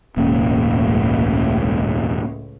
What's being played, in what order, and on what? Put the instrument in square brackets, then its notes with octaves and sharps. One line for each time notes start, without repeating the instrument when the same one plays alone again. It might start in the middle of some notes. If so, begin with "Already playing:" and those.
[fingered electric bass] E1 A#3 C#4 [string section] C#2 A2